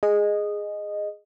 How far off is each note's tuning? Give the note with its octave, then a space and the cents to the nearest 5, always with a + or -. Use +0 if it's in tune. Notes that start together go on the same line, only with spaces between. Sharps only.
G#4 +0 D#5 -10